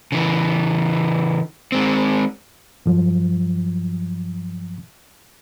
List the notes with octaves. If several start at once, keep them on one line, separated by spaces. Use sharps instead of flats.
C#3 E3
G#3 C4
G2 F3 F#3